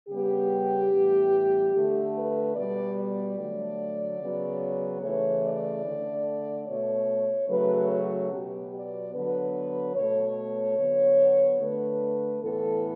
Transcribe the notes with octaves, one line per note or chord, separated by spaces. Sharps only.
C#3 G3 B3 G4
A2 E3 G3 B3
D3 A3 A4
B4
B2 G3 B3 D5
D5
D3 F#3 A3
C#3 F#3 B3
C#3 E3 A3 C#5
D5
D3 A3
B2 A3 C#5
C#3 F#3 A3 B4
F#4
B2 F#3 B3 G4
D5
D3 F#3 B3 B4
B2 A3 C#5
D3 F#3 B3
D3 A3 B4
A2 E3 B3 A4